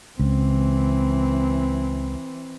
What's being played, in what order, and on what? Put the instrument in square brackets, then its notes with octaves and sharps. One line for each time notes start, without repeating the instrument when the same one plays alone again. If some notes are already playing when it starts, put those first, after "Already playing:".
[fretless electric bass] C#2 [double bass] E3 C4